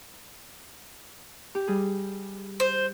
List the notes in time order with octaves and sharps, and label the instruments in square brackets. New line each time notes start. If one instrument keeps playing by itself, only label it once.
[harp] G4
G3 G#4
[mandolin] C5